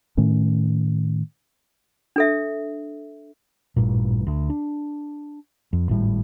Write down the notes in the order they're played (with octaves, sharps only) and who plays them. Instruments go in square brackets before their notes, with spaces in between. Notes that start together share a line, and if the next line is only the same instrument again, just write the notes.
[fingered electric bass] A2 D#3 A3 C#4
[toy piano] D4 A4 E5
[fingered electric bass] A1 G2 A#2
D2
D4
F2
G#1 A2 G3